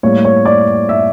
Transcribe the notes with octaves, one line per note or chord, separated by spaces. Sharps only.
A2 G3 A#3 C#5
C#5
D5
E5